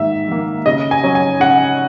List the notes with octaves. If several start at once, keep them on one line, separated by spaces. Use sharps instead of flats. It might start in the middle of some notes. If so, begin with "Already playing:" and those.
Already playing: G#2 D#3 A#3 E5
D#3 A#3
C#3 D#5
G#5
F#3 C#4
G#5
C#3 F#5